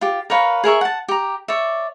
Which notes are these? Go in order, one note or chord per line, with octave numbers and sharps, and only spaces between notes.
F4 G4
A#4 B4 C#5 F5
G#4 A#4 E5 C#6
F#5 A5
G4 A#5
C#5 D5 E5